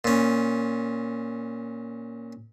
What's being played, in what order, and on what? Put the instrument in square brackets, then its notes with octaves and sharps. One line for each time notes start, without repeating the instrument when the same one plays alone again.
[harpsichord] A#2 C#4